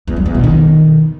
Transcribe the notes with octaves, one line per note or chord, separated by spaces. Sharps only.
E2
F#3
E2
B2
D#3